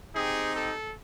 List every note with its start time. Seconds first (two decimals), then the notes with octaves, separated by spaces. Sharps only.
0.16 C4 D#4 G4 G#4
0.56 A4